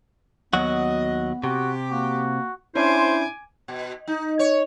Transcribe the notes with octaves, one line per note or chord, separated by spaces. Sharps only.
D#2 F#3 B3 F#4 D#5
C3 F#4 G4
A#3 F#4
C#4 D4 E4 C5 G#5 D6
B2
D#4
C#5